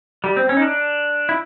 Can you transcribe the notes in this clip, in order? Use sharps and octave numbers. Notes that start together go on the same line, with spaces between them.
G3
C4
C#4
D#4
D4
E4